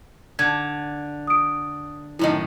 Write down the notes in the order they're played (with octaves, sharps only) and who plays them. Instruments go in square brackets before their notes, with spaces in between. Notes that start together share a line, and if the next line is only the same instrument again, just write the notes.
[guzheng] D3 [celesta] G#6
[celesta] D#6 D7
[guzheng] F#2 A2 D#3 [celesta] E4 D#5